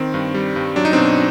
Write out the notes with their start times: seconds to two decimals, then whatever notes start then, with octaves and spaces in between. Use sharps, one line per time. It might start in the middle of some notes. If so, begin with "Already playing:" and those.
Already playing: D#3 C4
0.14 G2
0.34 G3
0.56 G2
0.76 F#3 D4
0.85 D#4
0.93 B2 C4 D4